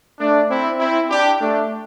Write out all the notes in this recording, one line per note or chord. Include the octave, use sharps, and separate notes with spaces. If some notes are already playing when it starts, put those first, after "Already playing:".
A3 D4
C4 E4
C4 E4
D4 G4
A3 D4